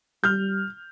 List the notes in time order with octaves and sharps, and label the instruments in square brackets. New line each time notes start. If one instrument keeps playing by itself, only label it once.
[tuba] G3 [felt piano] F6 G6